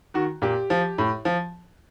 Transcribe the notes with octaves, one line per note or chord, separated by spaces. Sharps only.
D#3 F#4
A#2 G4
F3
A2
F3